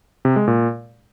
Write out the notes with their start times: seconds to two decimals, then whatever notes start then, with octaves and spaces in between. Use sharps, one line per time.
0.25 C3
0.36 G#3
0.48 A#2